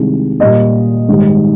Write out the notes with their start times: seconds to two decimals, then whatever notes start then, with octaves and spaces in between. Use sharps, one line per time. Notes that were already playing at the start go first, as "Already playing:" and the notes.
Already playing: C2 C3 D#3 G#3
0.40 A#2 G3 A#3 D#5
1.09 G#2 D#3 G3